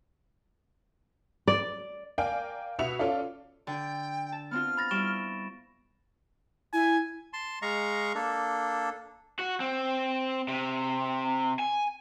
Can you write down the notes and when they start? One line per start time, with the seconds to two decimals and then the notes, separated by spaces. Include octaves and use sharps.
1.48 D5
2.18 A#4 D5 F5 G5 G#5
2.79 B2 B3 F#4 E5 C#7 F7
2.99 C#4 F4 A4 D5 F5
3.67 D3 G5
4.32 A5
4.51 B3 C4 F4 F6
4.77 B5 A6 A#6
4.91 G3 E4 C#6 D7 E7
6.73 E4 G#5
7.33 A5 C6
7.62 G#3 D#5 F5 A#5 C#6
8.15 A#3 D4 A4
9.39 F#4
9.60 C4
10.49 C3
11.59 G#5